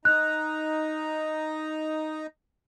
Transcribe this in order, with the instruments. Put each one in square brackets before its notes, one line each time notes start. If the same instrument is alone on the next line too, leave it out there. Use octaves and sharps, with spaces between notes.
[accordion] D#4 A#5 [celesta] F#6